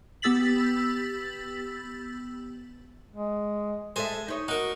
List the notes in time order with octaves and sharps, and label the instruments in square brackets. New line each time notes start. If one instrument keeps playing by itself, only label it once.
[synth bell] B3 G4 E6 A6 B6 F#7
[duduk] G#3
[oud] G#3 A4 E5 [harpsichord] C5 G#5
[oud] D#4 C#5
[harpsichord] D#4 A#4 [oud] F#4